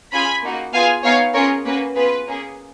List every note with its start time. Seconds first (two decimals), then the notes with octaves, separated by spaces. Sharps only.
0.12 C#4 F4 G#4 G#5 B5
0.44 A#3 D#4 F#4
0.73 B3 F4 G#4 F5 G#5
1.04 B3 D#4 G#4 C#5 F5
1.34 C#4 F4 G#4 A#4 C#5
1.65 A#3 C#4 F#4 B4
1.95 B3 F4 G#4 B4
2.26 A#3 C#4 G#4